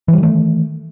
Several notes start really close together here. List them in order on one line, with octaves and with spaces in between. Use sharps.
E3 G3 D#3 A3